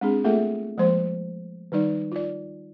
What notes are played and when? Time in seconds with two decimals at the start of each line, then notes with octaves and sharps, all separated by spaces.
0.01 G#3 C4 D4 G#4
0.24 A3 A#3 F4 G#4 A4 E5
0.78 F3 G#3 A#3 C5 C6
1.72 D#3 G3 D#4 D5
2.12 F4 D5